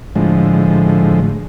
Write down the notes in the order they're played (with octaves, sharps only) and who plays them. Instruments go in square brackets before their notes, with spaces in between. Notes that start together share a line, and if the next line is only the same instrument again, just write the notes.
[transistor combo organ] A2 D3 F3 G#3